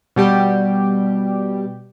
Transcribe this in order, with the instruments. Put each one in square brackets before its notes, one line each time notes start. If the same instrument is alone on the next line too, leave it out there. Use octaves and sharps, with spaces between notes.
[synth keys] B2 G3 G4